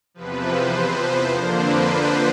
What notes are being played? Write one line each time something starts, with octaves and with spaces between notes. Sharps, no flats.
E2 C3 F3 B4
C5
C5
F2 D3 F3 A#3 D4
B4
C5